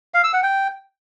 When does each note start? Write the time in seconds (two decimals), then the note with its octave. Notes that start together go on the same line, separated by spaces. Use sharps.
0.14 F5
0.24 E6
0.33 F#5
0.43 G5